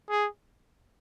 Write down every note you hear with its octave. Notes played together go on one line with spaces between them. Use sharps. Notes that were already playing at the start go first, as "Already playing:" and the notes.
G#4